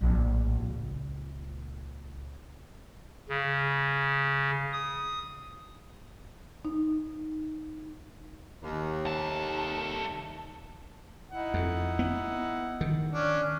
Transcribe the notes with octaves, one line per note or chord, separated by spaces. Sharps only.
A#1 A2
C#2 A#2
C#3
D#6
D#4
D#2
C2 A4
D#4 E4 F#5
F2
B3
D#3
C#4 D4